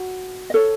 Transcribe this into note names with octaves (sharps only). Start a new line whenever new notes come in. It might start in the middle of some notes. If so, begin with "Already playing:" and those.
Already playing: F#4
D#5
A4 C#5